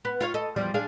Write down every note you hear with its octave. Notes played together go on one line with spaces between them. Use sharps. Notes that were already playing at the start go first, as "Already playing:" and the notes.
B3
F4 C#5 F5
A4 D#5
E2 F3 G3
D4 G#4 F5